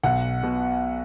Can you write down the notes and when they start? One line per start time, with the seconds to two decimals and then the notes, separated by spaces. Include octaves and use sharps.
0.03 B1 F#5
0.43 B2